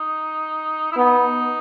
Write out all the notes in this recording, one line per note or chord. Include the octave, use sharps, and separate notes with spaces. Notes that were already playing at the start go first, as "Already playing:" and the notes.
Already playing: D#4
E4
B3 D#4